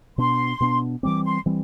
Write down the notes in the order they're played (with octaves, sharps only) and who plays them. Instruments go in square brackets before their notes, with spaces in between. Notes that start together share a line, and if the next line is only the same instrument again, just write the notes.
[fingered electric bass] B2 B3 D4 [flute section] C6
[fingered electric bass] B2 B3 D4
[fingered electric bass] E3 G3 C4 [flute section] D6
[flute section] C6
[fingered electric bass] E3 G3 C4